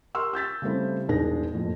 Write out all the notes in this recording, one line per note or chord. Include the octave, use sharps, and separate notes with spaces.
G4 A#4 C6 C#6 E6 F6
E6 G6 A6 B6
C#3 G3 A3 C4 E4
E1 C2 G#2 D4 G#4 A#6
F#1 F2 A2